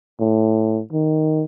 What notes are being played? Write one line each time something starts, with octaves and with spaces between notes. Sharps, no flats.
A2
D#3